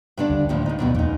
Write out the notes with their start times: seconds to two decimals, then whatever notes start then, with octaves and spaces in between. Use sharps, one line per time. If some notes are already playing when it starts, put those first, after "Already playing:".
0.17 G2 D3 D4
0.30 D2
0.49 D#2 A2 F3
0.66 G2 D#4
0.79 F#2 B2 D#3
0.95 E2 A#2 D#4